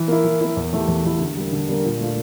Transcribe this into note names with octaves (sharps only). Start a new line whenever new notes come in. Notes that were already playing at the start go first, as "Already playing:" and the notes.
Already playing: E3
A#3 E4
E3
A#3 E4
E2
E3 A3 E4 G4
E2
E3 A3 E4 G4
D3
G3 A#3
D3
G3 A#3
A#2
A3 D4 F4